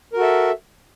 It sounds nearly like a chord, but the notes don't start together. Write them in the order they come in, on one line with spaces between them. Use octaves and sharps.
A#4 F#4 A4 E5